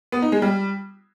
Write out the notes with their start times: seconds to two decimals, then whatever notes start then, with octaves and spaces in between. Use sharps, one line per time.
0.12 B3
0.22 D#4
0.32 G#3
0.42 G3